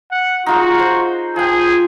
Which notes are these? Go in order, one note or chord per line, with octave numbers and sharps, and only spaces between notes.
F#5
D#4 F4 F#4 G#4
C5
F3 G#4 G5